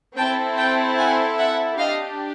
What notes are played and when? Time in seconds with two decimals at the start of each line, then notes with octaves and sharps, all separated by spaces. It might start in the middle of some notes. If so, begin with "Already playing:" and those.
0.17 C4 E4 A4 G5 A5
0.57 G5 A5
0.98 F#5 G#5
1.38 E5 F#5
1.78 D4 G4 D#5 F5